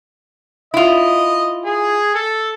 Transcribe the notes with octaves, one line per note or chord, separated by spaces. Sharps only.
E4 F4 D#5
G#4
A4